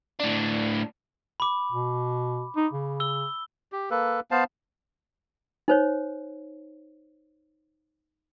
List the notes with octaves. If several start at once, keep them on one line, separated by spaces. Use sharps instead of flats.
A2 D4
B5 D6
B2
D#4
C#3
E6 G7
G4
A#3 A4 B4
B3 C5 F5 A5
D#4 C5 C#5